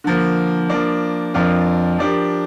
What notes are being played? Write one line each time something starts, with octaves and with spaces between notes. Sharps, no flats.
D3 F3 A#3
F3 A#3 D4
F2 F3 D4 F4 A#4
F3 D4 G4 A#4